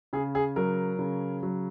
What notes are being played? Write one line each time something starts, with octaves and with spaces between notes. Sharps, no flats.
C#3 G#4
G#4
F#3 A#4
C#3
F#3